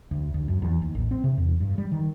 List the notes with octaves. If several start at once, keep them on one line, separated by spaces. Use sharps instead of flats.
D2
D2
F#2
E2
D#2
A1
C4
C3
E2
G2
G3
D#3